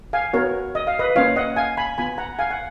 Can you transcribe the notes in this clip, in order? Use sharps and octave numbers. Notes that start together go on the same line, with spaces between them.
F5 G#5
B3 F#4 A#4 C#5
D#5
F5
B4 D#5
A#3 C#4 F4 C#5 F5
D#5 F#5
F5 G#5
G#5 B5
B3 F4 G#5 B5
F#5 A#5
F5 G#5
F#5